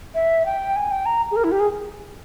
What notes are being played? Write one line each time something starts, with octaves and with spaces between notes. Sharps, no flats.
E5
G5
G#5
G5
A#5
G#4
A#4
E4
G4
G#4